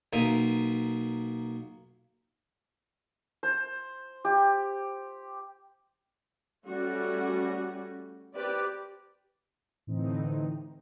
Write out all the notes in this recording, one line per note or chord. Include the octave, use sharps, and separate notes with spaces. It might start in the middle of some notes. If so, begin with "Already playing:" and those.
B1 A#3 E5 D#6
C5
G4
G3 A3 C#4 F#4
C4 G4 B4 D5
A2 D3 E3 C4 D#4